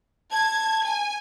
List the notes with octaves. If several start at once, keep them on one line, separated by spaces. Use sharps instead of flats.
A5 G#6
G#5